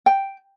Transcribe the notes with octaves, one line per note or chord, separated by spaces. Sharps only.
G5